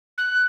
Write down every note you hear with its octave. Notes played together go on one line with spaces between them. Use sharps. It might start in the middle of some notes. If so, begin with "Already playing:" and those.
F#6